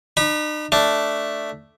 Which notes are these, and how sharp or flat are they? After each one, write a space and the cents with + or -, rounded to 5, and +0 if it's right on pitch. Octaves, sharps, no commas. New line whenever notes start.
D#4 -45 B5 -20
A3 +0 D4 +0